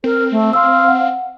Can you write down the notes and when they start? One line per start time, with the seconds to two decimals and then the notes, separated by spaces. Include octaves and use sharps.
0.04 C4 A#4
0.31 A3
0.53 F5 C6 E6
0.88 F#5